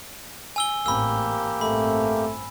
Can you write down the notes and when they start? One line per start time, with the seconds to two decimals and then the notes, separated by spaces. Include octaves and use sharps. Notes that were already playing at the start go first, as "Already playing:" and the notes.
0.56 G#5 E6 G7
0.86 A1 G#2 A#3 C4 G4 B5 E6
1.61 A1 G2 A3 C4 B5